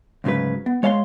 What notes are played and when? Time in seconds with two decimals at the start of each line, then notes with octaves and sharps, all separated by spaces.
0.24 D2 G#2 C#3 F#3 B4
0.66 B3
0.83 G#3 C#5 F5 A5 C6